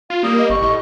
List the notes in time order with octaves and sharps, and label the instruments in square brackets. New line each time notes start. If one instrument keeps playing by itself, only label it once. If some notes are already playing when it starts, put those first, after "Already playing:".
[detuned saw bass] F4 [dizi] F5
[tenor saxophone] G3 [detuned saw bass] A#3 [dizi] D#6
[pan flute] D#5
[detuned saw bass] G1 [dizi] C#6
[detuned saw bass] A2 [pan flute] D#5